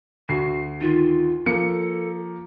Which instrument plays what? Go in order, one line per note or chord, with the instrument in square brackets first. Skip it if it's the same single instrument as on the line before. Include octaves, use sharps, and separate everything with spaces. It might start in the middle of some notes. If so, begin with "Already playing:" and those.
[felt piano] D2 [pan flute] F#4 [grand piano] C7
[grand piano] D#3 [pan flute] F4
[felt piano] F3 A#3 [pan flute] A4 [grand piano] C#7